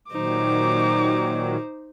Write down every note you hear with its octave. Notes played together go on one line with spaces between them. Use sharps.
A#2 D#3 F#3 D#4 C5 D6